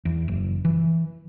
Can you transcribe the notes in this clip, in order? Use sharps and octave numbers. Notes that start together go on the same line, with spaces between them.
E2
F#1
E3